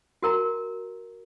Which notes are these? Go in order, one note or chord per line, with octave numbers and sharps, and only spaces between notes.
F#4 A#4 A#5